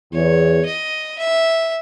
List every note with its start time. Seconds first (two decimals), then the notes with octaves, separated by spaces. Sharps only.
0.13 E2 C#5
0.65 D#5
1.18 E5